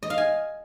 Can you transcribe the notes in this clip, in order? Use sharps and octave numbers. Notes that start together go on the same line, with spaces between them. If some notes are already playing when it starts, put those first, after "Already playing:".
D#5
F5
G#5